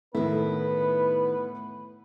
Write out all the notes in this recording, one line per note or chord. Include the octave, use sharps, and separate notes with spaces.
A2 D#3 B3 E4 B4